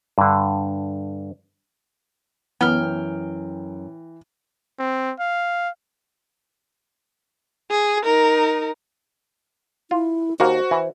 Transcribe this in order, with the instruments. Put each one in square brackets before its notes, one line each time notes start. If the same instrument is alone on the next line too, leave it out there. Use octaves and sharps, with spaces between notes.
[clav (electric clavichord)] G2 D3
[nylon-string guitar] F#2 [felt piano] E3 [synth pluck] B3 [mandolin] G5 F6
[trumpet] C4
F5
[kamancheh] G#4
D#4 A#4
[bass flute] E4 [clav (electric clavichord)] F4
[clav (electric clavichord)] D#2 A#3 [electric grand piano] F#4 [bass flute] C5
[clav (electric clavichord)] E3